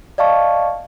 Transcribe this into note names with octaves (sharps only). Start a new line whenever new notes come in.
D5 D#5 F5 A5 C#6